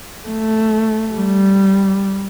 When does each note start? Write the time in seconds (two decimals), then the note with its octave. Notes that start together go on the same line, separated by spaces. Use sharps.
0.28 A3
1.14 G3